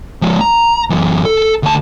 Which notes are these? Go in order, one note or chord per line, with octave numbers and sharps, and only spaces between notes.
F3 G#3
A#5
F#2 E3
A4
D2 A5